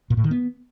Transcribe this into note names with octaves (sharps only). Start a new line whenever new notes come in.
A#2
A2
D#3
B3